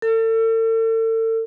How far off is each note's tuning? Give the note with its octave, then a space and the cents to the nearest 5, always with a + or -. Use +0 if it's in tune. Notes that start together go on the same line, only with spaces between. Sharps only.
A4 +40